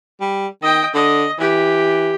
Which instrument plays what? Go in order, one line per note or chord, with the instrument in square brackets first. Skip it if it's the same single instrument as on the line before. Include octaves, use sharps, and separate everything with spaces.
[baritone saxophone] G3
[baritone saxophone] D#3 [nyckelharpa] D#5 G5
[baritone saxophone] D3 [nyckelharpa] D#5
[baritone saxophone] E3 [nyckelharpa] G4